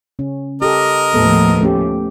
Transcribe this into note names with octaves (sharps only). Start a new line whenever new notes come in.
C#3 C#4
G4 A4 A#4 D#5
D#2 A2 F3 B3 A4
A3 C#4 G4